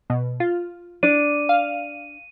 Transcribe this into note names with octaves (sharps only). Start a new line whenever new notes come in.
B2
F4
D4 D5 D#7
F5